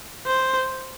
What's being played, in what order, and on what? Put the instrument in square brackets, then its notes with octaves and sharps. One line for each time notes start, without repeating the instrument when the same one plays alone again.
[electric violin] C5